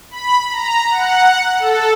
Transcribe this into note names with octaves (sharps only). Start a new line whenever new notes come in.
B5
A#5
F#5
A4